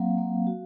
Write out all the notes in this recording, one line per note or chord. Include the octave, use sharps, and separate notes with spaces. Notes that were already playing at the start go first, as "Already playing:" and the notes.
Already playing: F#3 A#3 C4 F5
A#3
F#4